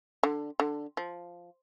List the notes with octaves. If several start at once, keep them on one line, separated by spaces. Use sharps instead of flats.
D3
D3
F3